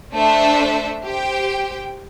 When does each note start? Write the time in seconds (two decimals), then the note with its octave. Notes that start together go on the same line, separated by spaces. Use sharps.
0.13 A3 D4 A4 C5 E5
1.03 G4 C5 G5